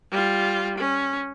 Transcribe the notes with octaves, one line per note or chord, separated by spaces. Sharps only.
G3 F4
C#4